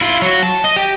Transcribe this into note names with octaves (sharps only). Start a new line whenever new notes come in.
E4 F4
F#3 F#4
A5
D#5
G4